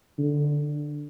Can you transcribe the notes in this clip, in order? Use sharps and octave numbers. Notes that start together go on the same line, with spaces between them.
D3